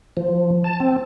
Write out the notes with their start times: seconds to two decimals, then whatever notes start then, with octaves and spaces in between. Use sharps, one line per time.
0.17 F3
0.64 A5
0.80 C4